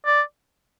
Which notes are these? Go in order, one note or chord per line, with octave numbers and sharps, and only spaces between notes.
D5